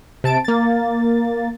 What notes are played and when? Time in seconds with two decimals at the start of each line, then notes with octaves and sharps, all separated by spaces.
0.24 C3 A5 D7
0.44 A#3 A6